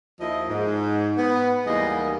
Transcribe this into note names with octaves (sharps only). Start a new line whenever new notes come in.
D#2 F3 E4 D#5
G#2
B3
D#2 E3 G3 G#3 A#3 D#5